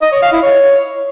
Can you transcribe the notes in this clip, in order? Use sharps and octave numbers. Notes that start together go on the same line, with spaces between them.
D#5
C#5
F5
E4
C#5